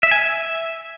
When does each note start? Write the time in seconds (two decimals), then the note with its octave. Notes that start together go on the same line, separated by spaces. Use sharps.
0.03 E5
0.11 G#5
0.20 E5